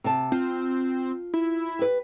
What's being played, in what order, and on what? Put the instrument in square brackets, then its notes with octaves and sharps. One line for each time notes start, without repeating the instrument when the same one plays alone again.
[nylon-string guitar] C3 A5
[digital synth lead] C4 [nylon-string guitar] F4
[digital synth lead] E4
[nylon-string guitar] G4 B4